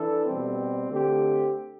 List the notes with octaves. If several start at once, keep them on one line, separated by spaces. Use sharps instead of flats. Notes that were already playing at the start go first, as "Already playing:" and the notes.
Already playing: E3 D4 A4
B2 G3 C4
D3 A3 C4 G4